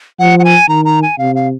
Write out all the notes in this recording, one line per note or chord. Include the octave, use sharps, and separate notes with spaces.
F3 F#5
F#5
G#5
D#3 A#5
A#5
G#5
C3 F5
F5